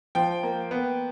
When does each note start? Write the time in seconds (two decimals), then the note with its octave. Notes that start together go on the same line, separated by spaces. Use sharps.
0.15 F3 G5
0.43 A#3
0.71 B3